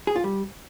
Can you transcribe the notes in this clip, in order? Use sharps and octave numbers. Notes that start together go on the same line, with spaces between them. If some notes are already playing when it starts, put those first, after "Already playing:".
G#4
F4
G3